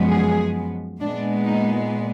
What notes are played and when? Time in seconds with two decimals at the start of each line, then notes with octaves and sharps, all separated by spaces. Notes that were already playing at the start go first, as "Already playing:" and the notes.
Already playing: F#2 F3 G#3 B3
0.09 G#4
1.00 A#2 G#3 B3 D4
1.45 D#4